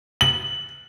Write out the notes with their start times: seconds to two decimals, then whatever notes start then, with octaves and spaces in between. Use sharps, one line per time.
0.21 F#7